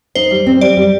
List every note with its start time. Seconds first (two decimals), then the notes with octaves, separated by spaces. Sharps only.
0.15 D#4 C5
0.31 G3
0.46 C4
0.61 G3 D5
0.77 G3